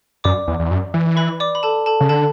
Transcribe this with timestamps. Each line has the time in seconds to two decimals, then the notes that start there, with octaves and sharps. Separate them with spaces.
0.24 F#2 D5 D6
0.48 E2
0.60 E2
0.71 F#2
0.94 E3
1.17 B4 B5
1.40 D5 D6
1.55 B5
1.63 A4 A5
1.86 A4 A5
2.01 C#3
2.09 D3 A4 A5